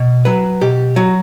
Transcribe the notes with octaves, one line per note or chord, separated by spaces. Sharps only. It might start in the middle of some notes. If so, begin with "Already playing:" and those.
Already playing: B2
F#3 B4
B2 G4
F#3 F#4